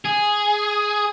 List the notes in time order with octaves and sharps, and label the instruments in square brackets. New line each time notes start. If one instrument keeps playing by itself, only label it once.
[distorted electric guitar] G#4